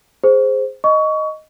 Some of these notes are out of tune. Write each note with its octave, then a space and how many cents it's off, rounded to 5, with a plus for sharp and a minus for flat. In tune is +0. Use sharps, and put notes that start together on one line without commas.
G#4 +0 C5 +0
D#5 +0 C#6 +25